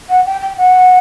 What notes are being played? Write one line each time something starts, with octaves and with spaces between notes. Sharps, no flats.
F#5
G5
G5
F#5